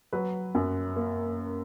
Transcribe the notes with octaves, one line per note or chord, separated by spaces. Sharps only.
F#3 B4
F#2
A#3